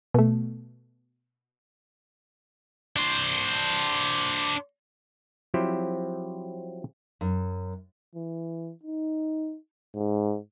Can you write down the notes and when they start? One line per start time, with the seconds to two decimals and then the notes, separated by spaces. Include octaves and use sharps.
0.14 B2 A3
2.96 D4 C5
5.54 F3 F#3 C4 E4 G4 C5
7.21 F#2
8.15 E3
8.83 D#4
9.95 G#2